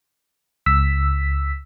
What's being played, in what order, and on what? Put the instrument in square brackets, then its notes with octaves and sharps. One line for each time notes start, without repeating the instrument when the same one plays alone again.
[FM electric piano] C#2 E6 B6